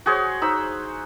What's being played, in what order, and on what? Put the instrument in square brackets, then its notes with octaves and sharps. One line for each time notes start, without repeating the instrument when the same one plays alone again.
[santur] F#4 G#4 C5 C#5
D#4 C5 B5 E6